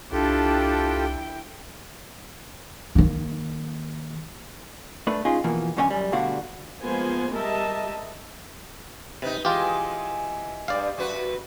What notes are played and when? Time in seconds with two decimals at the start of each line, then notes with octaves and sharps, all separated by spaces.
0.12 C2 D4 E4 F4 G4 A4 G5
2.95 D#3 A#3
5.07 A3 D4 B4
5.25 C#4 D#4 F4 G#4
5.44 B2 E3 F3 A#3
5.77 F#2 D3 C#4 C5 G#5
5.90 F#2 G3
6.12 D2 B2 D3 G3 F#4 F5
6.82 F3 G#3 A#3 B3 C5 G#5
7.36 G3 G#3 A#4 D#5 E5 A5
9.22 C3 D#4 B4
9.45 E3 G#3 F4 G4
10.68 G2 D5 F5
10.97 F#2 F#4 B4